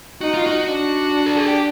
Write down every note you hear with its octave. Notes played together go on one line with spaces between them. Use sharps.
D#4 F#4
F4
F#4
D4
A4
G#4
G4